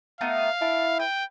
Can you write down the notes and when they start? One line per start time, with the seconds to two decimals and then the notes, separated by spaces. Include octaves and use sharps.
0.21 A3 B3 D#4 F5
0.61 D4 E4
0.99 B4 G5